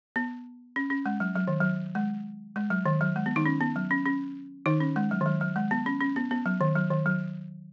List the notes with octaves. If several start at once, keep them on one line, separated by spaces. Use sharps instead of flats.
B3
C#4
C#4
G#3
F#3
F#3
D#3
F#3
G#3
G#3
F#3
D#3
F#3
G#3
B3
D#3 D#4
C#4
B3
F#3
C#4
C#4
D#3 D#4
C#4
G#3
F#3
D#3
F#3
F#3
G#3
B3
C#4
C#4
B3
B3
F#3
D#3
F#3
D#3
F#3